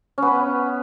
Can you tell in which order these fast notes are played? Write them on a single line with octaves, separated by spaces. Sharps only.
C#4 B3 B4